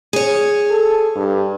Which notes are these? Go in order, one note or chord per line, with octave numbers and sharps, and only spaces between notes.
G#4 C#5
A4
G2